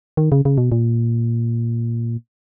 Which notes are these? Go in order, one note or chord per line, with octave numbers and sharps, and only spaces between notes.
D#3
C#3
C#3
B2
A#2